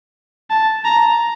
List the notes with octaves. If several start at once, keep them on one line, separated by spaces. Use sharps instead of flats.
A5
A#5